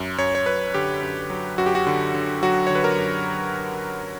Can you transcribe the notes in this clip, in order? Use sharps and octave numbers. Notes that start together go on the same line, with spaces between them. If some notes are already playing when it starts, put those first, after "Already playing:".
Already playing: F#2
F#2 C#5
C#5
F#2 B4
D3 G4
F#2
F#3
F#2 F#4
G4
F#4
D3
D3
F#3 F#4
D3 C#5
B4
A#4
F#2